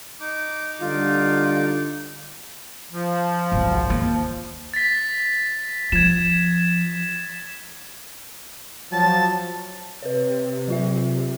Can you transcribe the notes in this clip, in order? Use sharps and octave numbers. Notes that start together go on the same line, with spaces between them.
D#4 D6
D3 G3 F4
F3
G#1 C#2
D#2
A6 B6
F3 G#6 E7
F3 F#3 A5
C3 B4 C#5
F#3 F4 E5